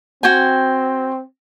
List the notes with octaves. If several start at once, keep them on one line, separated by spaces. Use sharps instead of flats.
C4 F#4 G5 G#5